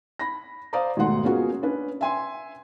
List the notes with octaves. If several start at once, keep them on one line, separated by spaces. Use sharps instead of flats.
B5 A#6
C5 D5 F5 A#5 D#6
D#2 G#2 B2 A3 F#5 C6
A#3 B3 C#4 F4 F#4 G#4
C#4 D4 B4
E5 G#5 C6